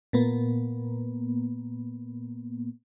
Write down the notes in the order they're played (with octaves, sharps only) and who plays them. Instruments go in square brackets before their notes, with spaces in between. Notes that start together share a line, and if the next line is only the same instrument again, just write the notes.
[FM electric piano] A#2 A#3 B3